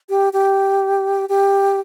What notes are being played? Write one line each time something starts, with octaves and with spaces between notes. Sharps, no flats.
G4
G4
G4